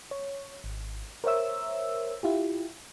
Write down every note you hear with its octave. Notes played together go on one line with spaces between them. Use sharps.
C#5
G#1
A#4 C5 C#5 E5 E6
E4 F4 G4